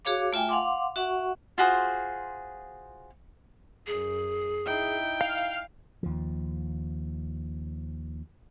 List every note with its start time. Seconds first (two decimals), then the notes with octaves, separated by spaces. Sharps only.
0.05 F#4 G#4 C#5 F5 D6
0.33 A3 F4 E5 G5 G#5
0.49 F5 F#5 C6 D6
0.96 F#4 E5 F#5 C#6
1.58 F4 F#4 G#4 C5
3.87 F#2 G#4
4.65 D#4 E4 G5
5.21 F5
6.03 D#2 F3